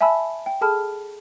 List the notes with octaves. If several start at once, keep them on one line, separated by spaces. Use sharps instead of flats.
E5 G#5 A5 B5 E6
G5
G#4 A4 A5 B5 F6